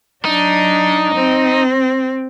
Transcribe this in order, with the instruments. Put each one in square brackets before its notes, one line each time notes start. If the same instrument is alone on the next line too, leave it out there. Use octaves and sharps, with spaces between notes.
[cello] F#3 D4 [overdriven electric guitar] D#4
[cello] C4